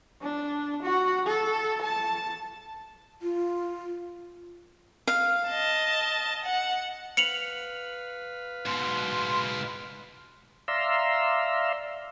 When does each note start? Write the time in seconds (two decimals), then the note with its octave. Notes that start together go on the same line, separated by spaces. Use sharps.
0.22 D4
0.82 F#4
1.27 A4
1.82 A5
3.22 F4
5.07 F5
5.49 D#5 A5
6.45 F#5
7.17 B4 F5 C#7 F7 F#7
8.66 G#2 B2 C6
10.68 D5 E5 F5 A#5 C6 E6